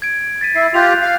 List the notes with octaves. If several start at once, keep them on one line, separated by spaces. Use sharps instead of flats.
G#6 D7
A6 B6 D#7
E4 C7
F4 G4 F#6 G6 F7
F5